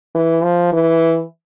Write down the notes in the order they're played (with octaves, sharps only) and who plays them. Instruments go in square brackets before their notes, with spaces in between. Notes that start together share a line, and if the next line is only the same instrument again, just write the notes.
[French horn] E3
F3
E3